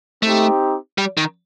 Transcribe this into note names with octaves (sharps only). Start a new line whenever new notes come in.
A3 C4 D#4 G4
G3
D#3